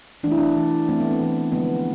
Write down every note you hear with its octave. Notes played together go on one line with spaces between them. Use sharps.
E3 A3 D4 E4
D4
E3 A3
E3 A3 C4
B3
C4
E3 A3
D3 F3 G#3 B3